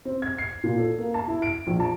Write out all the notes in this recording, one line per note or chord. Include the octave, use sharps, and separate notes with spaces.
C4
G#6
C7
A#2
A4
A#3
A5
E4
D7
A#1
A5